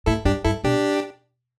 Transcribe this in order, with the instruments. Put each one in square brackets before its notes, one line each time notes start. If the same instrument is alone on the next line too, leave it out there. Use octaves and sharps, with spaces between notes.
[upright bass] A2 [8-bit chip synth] E4 A4
[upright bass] G2 [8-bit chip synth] D4 G4
[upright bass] G2 [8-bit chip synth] E4 A4
[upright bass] B2 [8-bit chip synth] D4 G4